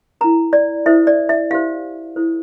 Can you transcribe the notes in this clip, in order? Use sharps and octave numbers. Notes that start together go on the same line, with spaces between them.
E4 A#4 A#5
D5
E4 A4 C5 E5
D5
E5
E4 G4 C5 F5
E4 A4 C5